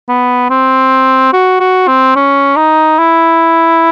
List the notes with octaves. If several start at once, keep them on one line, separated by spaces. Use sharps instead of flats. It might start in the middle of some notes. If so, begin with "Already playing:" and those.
B3
C4
F#4
F#4
C4
C#4
D#4
E4